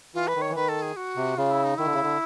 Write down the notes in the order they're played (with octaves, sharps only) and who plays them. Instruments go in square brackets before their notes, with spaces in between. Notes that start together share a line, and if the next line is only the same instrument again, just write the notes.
[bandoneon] E3 [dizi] F4
[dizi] B4
[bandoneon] D#3
[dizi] C#5
[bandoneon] E3
[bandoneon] D#3 [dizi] B4
[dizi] A4
G#4
F#4
[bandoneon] C3
[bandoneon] C#3 [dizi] F4
[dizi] E4
D#4
[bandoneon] D#3 [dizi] E4
[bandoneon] D3
C#3
D3